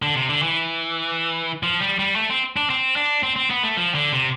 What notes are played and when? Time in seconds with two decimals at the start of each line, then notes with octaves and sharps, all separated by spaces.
0.02 D3
0.15 C3
0.29 D3
0.43 E3
1.63 F3
1.81 G3
1.99 G3
2.16 A3
2.30 C4
2.56 D4
2.70 C4
2.96 D4
3.23 C4
3.36 C4
3.50 B3
3.63 A3
3.77 F3
3.95 D3
4.13 C3